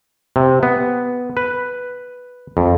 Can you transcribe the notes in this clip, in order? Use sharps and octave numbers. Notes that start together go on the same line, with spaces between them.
C3
B3
B4
F2